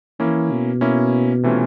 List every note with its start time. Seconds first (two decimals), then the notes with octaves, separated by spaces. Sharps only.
0.20 E3 A#3 C#4 E4
0.51 B2
0.81 A#3 C#4 E4
1.43 C3 E3 A3 C#4 F4